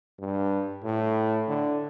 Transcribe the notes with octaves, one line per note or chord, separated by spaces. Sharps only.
G2
A2
D3